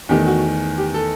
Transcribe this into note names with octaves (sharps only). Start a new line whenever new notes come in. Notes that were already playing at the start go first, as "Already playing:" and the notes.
E2 D#3 A3 G4
F#4
G4
A4